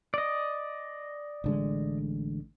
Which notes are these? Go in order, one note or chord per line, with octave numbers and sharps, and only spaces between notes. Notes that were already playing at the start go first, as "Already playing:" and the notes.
D5 D#5
A1 D3 G#3